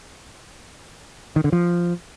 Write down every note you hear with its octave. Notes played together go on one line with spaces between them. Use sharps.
D#3
D3
F3